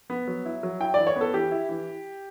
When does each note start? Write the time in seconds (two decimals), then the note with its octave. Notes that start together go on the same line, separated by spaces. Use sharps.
0.10 B3
0.28 F#3
0.46 E4
0.63 F#3
0.80 E4 G5
0.94 E3 D5
1.07 C#5
1.16 B3 A4
1.34 E3 G4
1.51 E4
1.69 E3